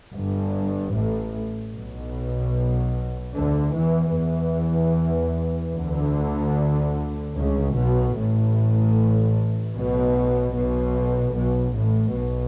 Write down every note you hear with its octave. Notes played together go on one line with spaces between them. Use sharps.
G1 G2
A1 A2
B1 B2
D2 D3
E2 E3
E2 E3
D2 D3
C#2 C#3
B1 B2
A1 A2
B1 B2
B1 B2
B1 B2
A1 A2
B1 B2